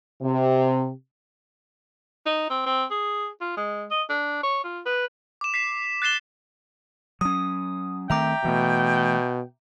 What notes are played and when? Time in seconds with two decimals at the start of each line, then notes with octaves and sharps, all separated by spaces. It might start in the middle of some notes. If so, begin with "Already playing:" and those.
0.21 C3
2.26 D#4
2.50 C4
2.66 C4
2.91 G#4
3.41 F4
3.57 G#3
3.91 D#5
4.10 D4
4.43 C#5
4.64 F4
4.86 B4
5.41 D6 E7
5.54 B6 C7 E7
6.02 F#6 A6 C7 E7 G7
7.21 F#3 C#4 D#6
8.10 D#3 A3 C4 E5 G5 A#5 D6
8.45 B2 E3 A3